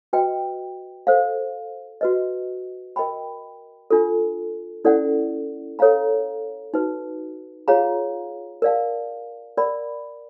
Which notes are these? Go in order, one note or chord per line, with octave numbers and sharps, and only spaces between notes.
F#4 B4 D#5 G5
A4 C5 F5
F#4 B4 D#5
A#4 D#5 G5 B5
D4 F4 A4
C#4 E4 A4 D5 F#5
A4 C#5 F5 A#5
D#4 F#4 B4
F4 G#4 C#5 F5 A#5
A#4 D5 F5 A5
A#4 D5 F#5 B5